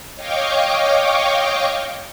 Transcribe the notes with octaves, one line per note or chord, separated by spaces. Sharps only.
C#5 D#5 F5 G5 C#6 D6